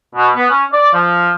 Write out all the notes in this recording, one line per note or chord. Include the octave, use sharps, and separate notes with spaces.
B2
B3
C#4
D5
F3